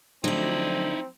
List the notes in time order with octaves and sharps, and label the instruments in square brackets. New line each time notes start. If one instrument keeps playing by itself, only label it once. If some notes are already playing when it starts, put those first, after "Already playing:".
[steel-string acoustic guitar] D3 D5 [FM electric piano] F3 F#3 A3 [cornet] C4 [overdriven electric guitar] D#4 E4